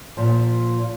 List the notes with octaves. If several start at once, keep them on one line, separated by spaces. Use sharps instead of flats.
A#2 F3